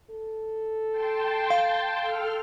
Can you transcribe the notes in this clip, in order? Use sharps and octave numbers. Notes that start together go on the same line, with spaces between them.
A4
G5 A5 C6
F5
A4 F6